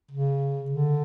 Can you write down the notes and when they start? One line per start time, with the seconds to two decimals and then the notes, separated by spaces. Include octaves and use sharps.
0.11 C#3
0.70 D3